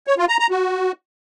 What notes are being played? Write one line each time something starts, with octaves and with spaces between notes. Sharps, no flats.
C#5
F4
A#5
A#5
F#4